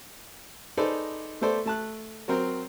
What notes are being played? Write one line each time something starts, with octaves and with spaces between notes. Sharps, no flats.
D#4 G#4 A4 B4 C5 D5
A3 B3 A4 C5 D5
A3 A5 F#6
F#3 C4 A#4 C5